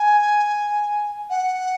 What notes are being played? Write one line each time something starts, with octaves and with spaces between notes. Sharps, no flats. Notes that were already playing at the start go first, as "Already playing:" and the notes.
Already playing: G#5
F#5